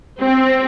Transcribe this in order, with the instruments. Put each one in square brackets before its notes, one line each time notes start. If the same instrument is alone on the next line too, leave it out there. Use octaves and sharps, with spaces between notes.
[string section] C4